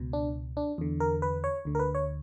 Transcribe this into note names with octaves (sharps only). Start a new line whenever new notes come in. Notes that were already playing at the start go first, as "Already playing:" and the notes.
Already playing: C#2 B2
D4
D4
E2 D3
A#4
B4
C#5
D2 D3
A#4
B4
C#5